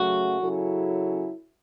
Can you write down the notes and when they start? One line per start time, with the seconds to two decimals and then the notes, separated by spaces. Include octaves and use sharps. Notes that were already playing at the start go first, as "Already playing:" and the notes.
Already playing: C#3 F#3 A3 F#4
0.39 C#3 F#3 C#4 E4 A4